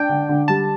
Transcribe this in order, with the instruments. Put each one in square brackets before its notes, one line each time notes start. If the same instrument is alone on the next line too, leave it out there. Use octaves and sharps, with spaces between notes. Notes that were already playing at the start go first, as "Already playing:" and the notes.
Already playing: [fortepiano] D4 [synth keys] G5
[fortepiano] D3
D3
[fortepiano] G3 [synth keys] A5